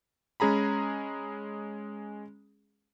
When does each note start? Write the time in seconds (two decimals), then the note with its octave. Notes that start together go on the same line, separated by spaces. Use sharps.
0.40 G#3 C#4 G#4 A#5 B5